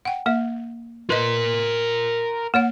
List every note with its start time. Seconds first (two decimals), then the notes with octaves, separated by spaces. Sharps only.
0.05 F#5 G5
0.26 A#3 E5
1.10 A#4 B4 D#5 C6
2.54 A#3 C#5 F#5